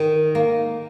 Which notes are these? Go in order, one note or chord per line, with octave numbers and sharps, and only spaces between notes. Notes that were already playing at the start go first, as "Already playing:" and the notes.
Already playing: D#3
A#3